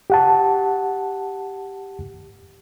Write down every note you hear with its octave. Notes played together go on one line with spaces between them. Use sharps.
G4 F#5 A5